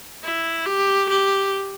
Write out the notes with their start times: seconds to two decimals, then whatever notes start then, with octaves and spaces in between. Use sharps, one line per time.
0.24 E4
0.66 G4
1.09 G4